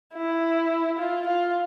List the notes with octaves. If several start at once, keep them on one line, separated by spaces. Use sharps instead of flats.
E4
F4
F4